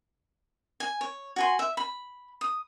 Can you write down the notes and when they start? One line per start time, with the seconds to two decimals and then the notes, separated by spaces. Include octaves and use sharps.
0.80 G#5
1.01 C#5
1.36 F#4 G#5 C6
1.59 E5
1.77 B5
2.41 D#6